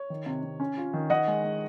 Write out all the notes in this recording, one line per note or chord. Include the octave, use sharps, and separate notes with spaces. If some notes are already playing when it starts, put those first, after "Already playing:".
Already playing: C#5
D#3
C3
C3
C#4
F4
D#3
D#3 D#5 F#5
G#3
G#3